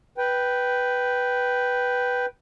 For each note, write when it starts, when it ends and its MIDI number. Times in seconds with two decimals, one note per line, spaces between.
0.18 2.26 71
0.18 2.26 79